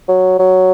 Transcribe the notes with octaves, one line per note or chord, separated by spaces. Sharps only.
F#3
F#3